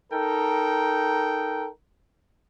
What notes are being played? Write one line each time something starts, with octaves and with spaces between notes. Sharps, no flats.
D#4 A4 A#4 G5